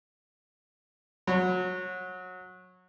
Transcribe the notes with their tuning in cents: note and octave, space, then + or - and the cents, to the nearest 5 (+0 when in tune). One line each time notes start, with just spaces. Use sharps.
F#3 -20